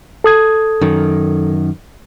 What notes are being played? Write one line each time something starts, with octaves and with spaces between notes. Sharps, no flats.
A4 D#6 G#6
F#2 D#3